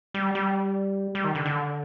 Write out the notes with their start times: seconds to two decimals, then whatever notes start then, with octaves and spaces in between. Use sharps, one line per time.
0.14 G3
0.35 G3
1.15 G3
1.24 D#3
1.35 D3
1.46 D3